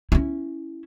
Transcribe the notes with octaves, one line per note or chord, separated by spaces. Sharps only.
C#4 E4